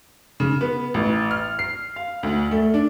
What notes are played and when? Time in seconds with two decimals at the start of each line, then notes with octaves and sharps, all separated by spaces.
0.40 C#3
0.61 B3
0.94 A1
1.31 F6
1.59 C7
1.96 F5
2.23 D2
2.51 A3
2.74 D4